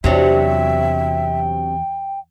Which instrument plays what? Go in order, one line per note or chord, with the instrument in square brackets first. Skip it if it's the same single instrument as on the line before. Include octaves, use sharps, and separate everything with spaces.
[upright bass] E2 [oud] C3 F#3 D4 [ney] E5 [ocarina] G5